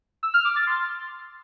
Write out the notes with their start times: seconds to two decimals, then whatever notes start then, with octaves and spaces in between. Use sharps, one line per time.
0.23 E6
0.34 F6
0.45 D6
0.56 A6
0.67 C6